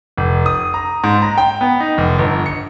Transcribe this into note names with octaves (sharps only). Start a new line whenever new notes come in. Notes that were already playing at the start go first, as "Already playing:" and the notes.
F1
D#6
A#5
G#2
A#5
G5
B3
D#4
F1
G1
C#7